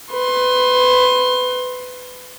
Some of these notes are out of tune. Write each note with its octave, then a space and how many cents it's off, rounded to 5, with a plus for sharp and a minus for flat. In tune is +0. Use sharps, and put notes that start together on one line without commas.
B4 +25 C6 +25